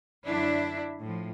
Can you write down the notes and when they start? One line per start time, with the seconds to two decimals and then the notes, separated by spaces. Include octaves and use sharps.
0.24 F#2 D3 F#3 D4 E4
1.02 A2 F3